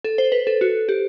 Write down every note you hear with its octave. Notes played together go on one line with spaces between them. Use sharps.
A4
C5
B4
A4
F#4
G4